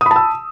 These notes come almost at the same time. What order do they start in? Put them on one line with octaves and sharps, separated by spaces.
D#6 B5 A5 E6